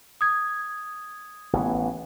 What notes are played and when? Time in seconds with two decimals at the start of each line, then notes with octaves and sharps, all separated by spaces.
0.21 D#6 G#6
1.53 A1 E3 B3